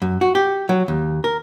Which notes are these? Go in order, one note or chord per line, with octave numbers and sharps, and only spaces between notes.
F#2
F#4
G4
F#3
D#2
A#4